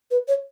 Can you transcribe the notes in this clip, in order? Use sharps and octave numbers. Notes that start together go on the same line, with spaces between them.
B4
C#5